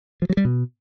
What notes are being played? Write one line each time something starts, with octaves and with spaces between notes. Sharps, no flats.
F3
F#3
G3
B2